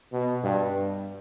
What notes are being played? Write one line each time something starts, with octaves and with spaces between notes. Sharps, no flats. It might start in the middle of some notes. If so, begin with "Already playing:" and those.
B2
G2